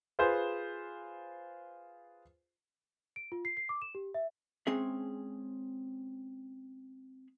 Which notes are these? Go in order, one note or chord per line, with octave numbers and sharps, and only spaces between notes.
F4 G#4 B4 C5
D7
F4
C7
C7
D6
E7
G4
E5
G#3 C4 C#4 G#4 E5